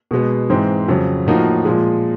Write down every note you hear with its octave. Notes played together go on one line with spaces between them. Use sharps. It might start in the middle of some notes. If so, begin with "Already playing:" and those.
B2 G#3 B3
G#2 E3 G#3 C4
F2 C#3 F#3
A2 F3 A#3 D#4 F#4
A#2 F3 G#3